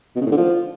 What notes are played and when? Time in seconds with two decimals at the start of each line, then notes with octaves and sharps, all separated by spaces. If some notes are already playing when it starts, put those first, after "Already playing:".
0.15 B2
0.21 C#3
0.26 A2
0.31 D3
0.36 F3